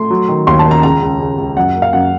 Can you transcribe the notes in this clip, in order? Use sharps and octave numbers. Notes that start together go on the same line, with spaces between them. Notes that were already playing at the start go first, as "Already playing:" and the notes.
Already playing: A3 C6
F#3
D#3
D#2 C6
A5
D#3
A#5
C#2 A#5
C#2
C#2
C#2
F#2 F#5
A#3
F5
F#2 F#5